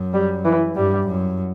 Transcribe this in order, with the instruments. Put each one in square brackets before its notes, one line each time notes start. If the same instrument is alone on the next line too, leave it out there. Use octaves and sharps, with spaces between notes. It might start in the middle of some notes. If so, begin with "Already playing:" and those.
Already playing: [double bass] F#2
[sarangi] G3
E3
[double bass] G2 [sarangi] G3
[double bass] F#2